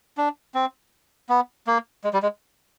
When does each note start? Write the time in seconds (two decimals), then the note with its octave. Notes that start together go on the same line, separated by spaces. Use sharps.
0.17 D4
0.54 C4
1.29 B3
1.67 A#3
2.04 G#3
2.13 G3
2.23 G#3